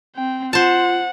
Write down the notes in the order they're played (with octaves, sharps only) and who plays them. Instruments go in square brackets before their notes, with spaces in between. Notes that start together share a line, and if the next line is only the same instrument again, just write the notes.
[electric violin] C4 G5
[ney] F4 [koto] C5 A5 [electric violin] F#5